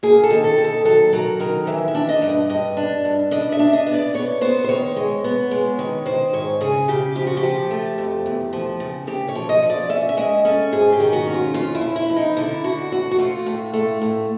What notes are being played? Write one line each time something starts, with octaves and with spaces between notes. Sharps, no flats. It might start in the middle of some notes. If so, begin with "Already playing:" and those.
A#3 G#4
A4
D#3
A4
D#3
A4
F#3 A4
F#3 A#4
D#3 A#4
E3 E5
E5
D4
D#5
G2
D#5
G2 D#5
D4
G2
D4 D#5
E5
D4
D#5
B3
D5
B3 C#5
B3 C5
C5
D#3 C#5
G#3
B3
G#3
D#3 C#5
D#3 C5
G#2 C#5
C#3 G#4
C#3 G4
F3 G4
F#4
G4
F3
A3
F2
E2
F3
C#3
C#3 G4
C#5
F3
D#5
F3
D5
C#4 E5
E5
G#3 D#5
C#4 A4
G#2 G#4
G4
D#3
F#4
C#4
F4
F2 F4
E4
F2
E4
F2
D#4
D3 E4
D3 F#4
F2 F#4
F#4
A3 F4
A2
A3
A2